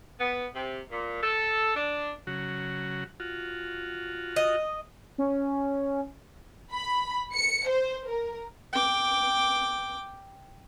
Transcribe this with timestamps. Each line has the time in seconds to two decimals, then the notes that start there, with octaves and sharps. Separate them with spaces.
0.20 B3
0.56 C3
0.91 A#2
1.23 A4
1.76 D4
2.27 C#3 F#3 F#4
3.20 F4 F#4
4.36 D#5
5.18 C#4
6.72 B5
7.34 C#7
7.68 C5
8.07 A#4
8.73 G5 D6